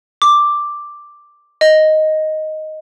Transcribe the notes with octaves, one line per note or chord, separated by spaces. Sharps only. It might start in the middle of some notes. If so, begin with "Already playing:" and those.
D6
D#5